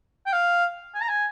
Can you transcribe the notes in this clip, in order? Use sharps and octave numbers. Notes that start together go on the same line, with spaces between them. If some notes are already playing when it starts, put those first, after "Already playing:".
G5
F5
G#5
A#5
G#5